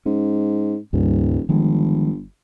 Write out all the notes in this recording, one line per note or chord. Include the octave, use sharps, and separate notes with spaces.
G#2 C#4
D#1 C#2 G2
G1 D#3 F3 G#3